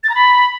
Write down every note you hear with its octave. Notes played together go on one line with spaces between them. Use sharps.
A6
A#5
B5